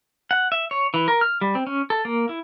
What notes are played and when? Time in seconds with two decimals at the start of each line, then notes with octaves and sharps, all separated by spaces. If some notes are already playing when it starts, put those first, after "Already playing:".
0.31 F#5
0.52 E5
0.71 C#5
0.94 E3
1.08 A#4
1.21 F6
1.41 G3
1.55 C4
1.67 C#4
1.90 A4
2.05 A#3
2.29 E4